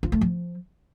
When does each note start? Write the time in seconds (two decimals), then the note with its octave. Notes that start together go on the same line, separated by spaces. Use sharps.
0.03 F4
0.12 A3
0.21 F3